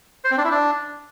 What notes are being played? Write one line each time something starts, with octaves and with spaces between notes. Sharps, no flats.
C5
C4
D4
E4
D4